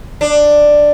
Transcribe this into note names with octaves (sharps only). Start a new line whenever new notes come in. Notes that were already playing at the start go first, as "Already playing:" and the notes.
D4